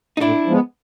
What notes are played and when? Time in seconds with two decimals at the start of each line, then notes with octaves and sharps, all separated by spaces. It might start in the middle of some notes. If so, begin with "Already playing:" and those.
0.17 D#4
0.21 A2 D4 E4
0.46 F3 G#3 B3